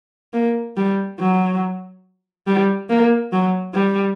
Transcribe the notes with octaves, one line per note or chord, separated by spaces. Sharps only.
A#3
G3
F#3
G3
A#3
F#3
G3